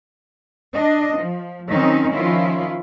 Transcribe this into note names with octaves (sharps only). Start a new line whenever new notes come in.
D4 D#5
F3
D#3 F#3 C4 C#4 D#4
D#3 F3 C#4 E4 F4